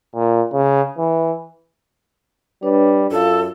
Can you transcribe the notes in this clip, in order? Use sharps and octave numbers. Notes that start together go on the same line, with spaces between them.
A#2
C#3
E3
G3 D4 B4 C#5
F#2 F4 A4 F5